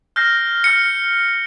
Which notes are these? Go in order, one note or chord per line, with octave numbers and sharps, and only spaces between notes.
F6 G6 A#6 C7
F6 A#6 C#7